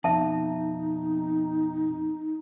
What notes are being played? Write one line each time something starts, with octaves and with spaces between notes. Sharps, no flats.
F2 B2 D#4 E5 A5